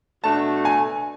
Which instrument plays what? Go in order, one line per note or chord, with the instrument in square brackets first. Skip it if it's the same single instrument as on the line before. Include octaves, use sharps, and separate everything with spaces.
[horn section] B2 A3 D4 F#4 [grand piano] A5
[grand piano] G#5